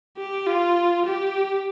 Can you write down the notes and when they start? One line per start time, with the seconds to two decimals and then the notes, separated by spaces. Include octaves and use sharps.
0.18 G4
0.47 F4
1.06 G4